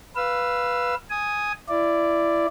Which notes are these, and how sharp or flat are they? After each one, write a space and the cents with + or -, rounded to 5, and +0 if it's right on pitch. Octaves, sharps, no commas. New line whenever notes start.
B4 -5 F5 +0 E6 +20
G#5 +0 D#6 +0
E4 +20 D5 +0